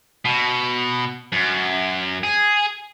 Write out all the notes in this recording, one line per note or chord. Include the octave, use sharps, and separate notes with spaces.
B2
F#2
G#4